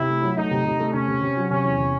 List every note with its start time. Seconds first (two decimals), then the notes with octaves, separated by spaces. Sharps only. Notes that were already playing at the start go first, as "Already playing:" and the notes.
Already playing: C3 E4
0.09 A3
0.22 F#3
0.37 A3 D#4
0.51 C3
0.65 C3
0.79 A3
0.93 C3 C#4
1.08 C3
1.21 C3
1.37 F#3
1.50 C3 C#4
1.64 E2
1.78 C3